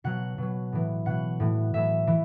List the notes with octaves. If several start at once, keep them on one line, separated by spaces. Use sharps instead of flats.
B2 F#3 F#5
B2 F#3
A2 E3
B2 F#3 F#5
A2 E3
A2 F#3 E5
E3